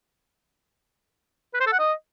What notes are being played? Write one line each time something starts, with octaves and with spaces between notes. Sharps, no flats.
B4
C5
A4
F#5
D#5